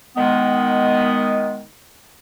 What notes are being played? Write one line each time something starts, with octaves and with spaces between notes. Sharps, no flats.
D#3 G#3 B3